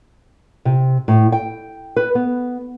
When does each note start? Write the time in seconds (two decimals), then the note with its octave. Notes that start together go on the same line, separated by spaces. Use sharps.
0.65 C3
1.08 A2
1.32 G5
1.96 B4
2.15 B3